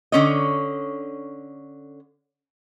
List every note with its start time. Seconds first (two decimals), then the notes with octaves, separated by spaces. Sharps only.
0.12 D3 C#4 C#5 D#5